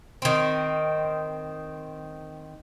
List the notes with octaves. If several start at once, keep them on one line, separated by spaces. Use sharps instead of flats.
D#3 C4